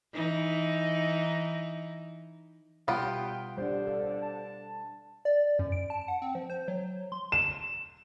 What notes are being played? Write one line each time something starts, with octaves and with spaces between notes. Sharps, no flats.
E3 D#4
B2 G3 B3 F4 G5
D3 G3 D4 C5
A4 F5
A5
D5
F#2
D7
A5
F#5
C4
F3
C5
F#3
C6
E7